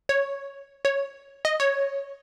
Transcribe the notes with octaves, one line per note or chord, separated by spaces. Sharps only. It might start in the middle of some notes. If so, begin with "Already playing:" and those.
C#5
C#5
D#5
C#5